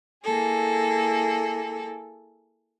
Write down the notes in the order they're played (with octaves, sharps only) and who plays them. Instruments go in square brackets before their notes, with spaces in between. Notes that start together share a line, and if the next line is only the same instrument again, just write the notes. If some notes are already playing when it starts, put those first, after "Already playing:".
[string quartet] A#3 E4 G#4 A4